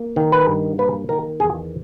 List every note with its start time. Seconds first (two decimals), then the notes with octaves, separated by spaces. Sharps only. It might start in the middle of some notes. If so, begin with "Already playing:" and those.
Already playing: A#3
0.16 D#3
0.32 B4
0.47 G2
0.78 A#3 B4
1.09 D#3 A#4
1.40 E2 G#4